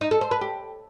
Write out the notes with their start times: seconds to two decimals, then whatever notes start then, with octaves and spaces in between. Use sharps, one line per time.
0.01 D#4
0.11 A4
0.21 C5
0.31 B4
0.41 G4